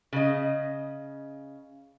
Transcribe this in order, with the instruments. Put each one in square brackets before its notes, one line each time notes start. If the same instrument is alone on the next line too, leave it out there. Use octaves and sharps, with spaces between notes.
[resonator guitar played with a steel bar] C#3 D#5